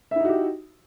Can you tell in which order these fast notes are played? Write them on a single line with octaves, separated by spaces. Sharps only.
E5 E4 D#4 F#4 G4